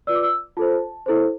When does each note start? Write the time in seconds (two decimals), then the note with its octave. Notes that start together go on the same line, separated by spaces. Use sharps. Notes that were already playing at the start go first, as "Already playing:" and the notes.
0.07 F4 B4 D5 E6
0.15 D6
0.23 E6
0.57 F4 A4 C5 A5
1.06 E4 A4 C5